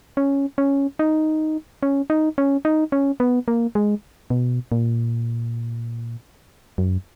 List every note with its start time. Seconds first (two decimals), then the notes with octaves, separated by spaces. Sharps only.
0.17 C#4
0.58 C#4
0.99 D#4
1.83 C#4
2.10 D#4
2.38 C#4
2.65 D#4
2.92 C#4
3.20 B3
3.48 A#3
3.75 G#3
4.30 B2
4.72 A#2
6.78 F#2